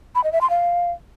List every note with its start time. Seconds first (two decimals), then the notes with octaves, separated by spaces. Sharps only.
0.15 B5
0.24 D#5
0.33 E5
0.41 C6
0.50 F5